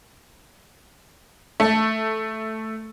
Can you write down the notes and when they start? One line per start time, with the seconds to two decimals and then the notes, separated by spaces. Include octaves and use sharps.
1.60 A3